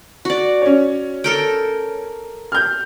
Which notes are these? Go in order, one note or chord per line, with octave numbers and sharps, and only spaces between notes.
F#4 D5
C#4 C#5
A4 A#4 G5
F6 G6